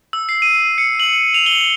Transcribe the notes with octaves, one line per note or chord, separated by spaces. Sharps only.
E6
C7
D#7
C#7
F#7
F7
G7